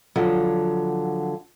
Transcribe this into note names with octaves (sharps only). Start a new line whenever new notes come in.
D3 F3 F#3